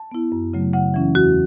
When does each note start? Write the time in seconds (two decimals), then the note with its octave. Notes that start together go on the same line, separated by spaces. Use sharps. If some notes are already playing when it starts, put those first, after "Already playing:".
Already playing: A5
0.11 B3 E4
0.32 F#2
0.53 C#3 F#3 A3
0.73 C#3 F#5
0.94 E3 C#4 E4
1.15 E2 F#4